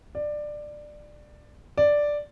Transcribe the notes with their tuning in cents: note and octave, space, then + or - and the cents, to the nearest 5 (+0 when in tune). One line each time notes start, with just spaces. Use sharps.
D5 +15
D5 +0